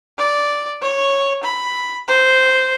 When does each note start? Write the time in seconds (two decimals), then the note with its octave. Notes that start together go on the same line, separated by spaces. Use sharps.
0.18 D5
0.82 C#5
1.43 B5
2.08 C5